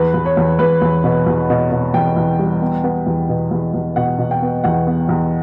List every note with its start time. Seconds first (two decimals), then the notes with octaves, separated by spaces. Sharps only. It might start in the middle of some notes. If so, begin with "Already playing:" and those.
Already playing: E2 B4
0.14 E2
0.26 C#5
0.37 E2
0.59 E2 B4
0.82 E2
1.04 B2
1.27 E2
1.50 B2
1.71 B2
1.94 E2 G5
2.16 E2
2.39 G3
2.61 B3
2.84 B3
3.07 E2
3.29 B2
3.51 E2
3.74 E2
3.96 B2 F#5
4.19 B2
4.31 G5
4.42 B3
4.64 E2 F#5
4.87 B3
5.09 E2